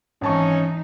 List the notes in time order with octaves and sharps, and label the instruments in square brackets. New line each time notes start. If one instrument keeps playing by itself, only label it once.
[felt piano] G#1 A5 C#6 [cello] E3 D#4 [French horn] C#4